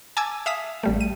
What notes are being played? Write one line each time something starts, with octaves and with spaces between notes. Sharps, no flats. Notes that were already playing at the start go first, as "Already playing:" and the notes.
G#5 A5 D6 E6 G#6
E5 F5 D#6 B6
A1 G3 A3
D#7